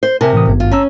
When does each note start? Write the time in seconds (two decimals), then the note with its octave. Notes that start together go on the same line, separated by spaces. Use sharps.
0.03 C5
0.21 C3 A#4 E5 G#5 A5
0.33 A2 E3 D#6
0.47 G#1 G2 B3
0.60 F4
0.71 C#4 A5 A#5 E6